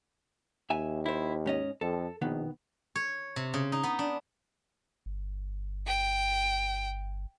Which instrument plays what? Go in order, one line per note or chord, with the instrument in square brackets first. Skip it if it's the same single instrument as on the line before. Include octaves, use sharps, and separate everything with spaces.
[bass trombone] D#2 [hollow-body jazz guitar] E5 G#5
[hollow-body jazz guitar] E4 C5
G#2 C#4 D#5
[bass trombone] F2 [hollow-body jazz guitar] A4
[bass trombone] A#1 [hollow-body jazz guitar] B2 D#3 B3
[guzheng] C#5
C3
C#3
D#4
B3
D4
[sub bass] G1
[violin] G5